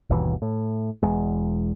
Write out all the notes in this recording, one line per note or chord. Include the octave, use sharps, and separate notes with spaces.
G1 D#2 B2 E3
A2
E1 E2 G#3